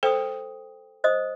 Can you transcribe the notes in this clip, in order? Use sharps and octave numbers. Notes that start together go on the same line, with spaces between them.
A4 C5 G5 D#6
C5 D#5 D#6